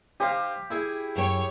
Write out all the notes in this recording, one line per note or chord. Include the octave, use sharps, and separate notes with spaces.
D#4 G4 C5 F5
E4 G#4
F#2 C#5 G5